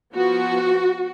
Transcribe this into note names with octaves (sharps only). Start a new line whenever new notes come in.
F3 B3 F#4